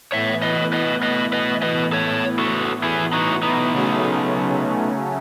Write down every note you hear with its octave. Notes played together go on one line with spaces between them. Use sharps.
A2 E3 B3 C#5 E5
B4 D#5
B4 D#5
B4 D#5
B4 D#5
B4 D#5
A4 C#5
F#4 A4
E4 G#4
D#4 F#4
B3 D#4
C#3 F#3 A3 C#4